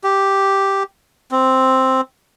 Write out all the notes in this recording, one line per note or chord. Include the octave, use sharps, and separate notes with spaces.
G4
C4